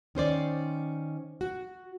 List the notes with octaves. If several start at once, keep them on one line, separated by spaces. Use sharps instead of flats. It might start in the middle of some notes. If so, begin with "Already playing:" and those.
D#3 C#4 C5 D5
F#4